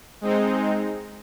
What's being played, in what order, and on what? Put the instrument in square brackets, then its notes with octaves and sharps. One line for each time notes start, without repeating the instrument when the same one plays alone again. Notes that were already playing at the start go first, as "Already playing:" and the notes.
[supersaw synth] G#3 C4 D#4